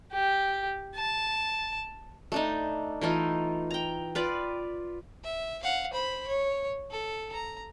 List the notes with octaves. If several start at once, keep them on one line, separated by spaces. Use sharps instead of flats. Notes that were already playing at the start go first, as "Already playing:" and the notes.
G4
A5
A3 D4 D#4
E3 A3 D#4 F4
G5 A#5
F4 B4 D5
E5
F5 F#5
C5 B5
C#5
A4
A#5